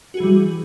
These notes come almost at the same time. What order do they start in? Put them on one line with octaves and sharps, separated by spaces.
F#4 G#4 E3 G3